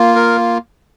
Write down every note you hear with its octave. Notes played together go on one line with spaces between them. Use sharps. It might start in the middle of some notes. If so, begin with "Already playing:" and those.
Already playing: A#3 F4
A#4